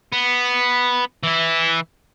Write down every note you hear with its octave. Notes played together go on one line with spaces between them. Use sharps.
B3
E3 E4